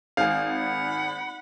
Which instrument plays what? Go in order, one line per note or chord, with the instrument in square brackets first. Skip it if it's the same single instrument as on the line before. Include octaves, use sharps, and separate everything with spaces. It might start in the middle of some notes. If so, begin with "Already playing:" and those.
[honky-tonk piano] G#1 C4 [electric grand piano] F5 G#5
[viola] F#5 B5